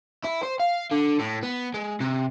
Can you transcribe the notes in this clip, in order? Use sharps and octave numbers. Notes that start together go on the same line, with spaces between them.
E4
C5
F5
D3
A2
B3
G#3
C3